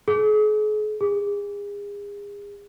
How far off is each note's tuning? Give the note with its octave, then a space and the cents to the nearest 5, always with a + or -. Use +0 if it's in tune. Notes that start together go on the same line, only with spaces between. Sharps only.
G#4 +40
G#4 -35